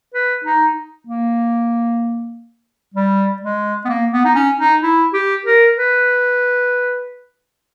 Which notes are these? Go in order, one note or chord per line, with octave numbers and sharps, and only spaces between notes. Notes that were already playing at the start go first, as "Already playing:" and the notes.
B4
D#4
A#3
G3
G#3
B3
A#3
B3
D#4
C#4
D#4
E4
G4
A#4
B4